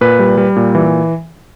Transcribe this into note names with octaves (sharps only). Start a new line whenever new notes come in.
A#2 B4
G3
G3
A#2
E3